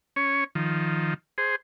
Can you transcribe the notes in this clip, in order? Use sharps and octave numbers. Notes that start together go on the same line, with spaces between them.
C#4 C#5
D#3 F3
G#4 C5